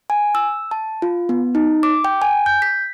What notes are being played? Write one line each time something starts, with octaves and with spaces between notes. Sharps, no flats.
G#5
E6
A5
F4
B3
D#4
D6
G5
G#5
G6
B6